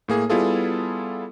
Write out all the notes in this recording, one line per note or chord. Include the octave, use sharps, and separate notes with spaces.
A2 A#3 G#4
G3 B3 E4 F4 G#4 A4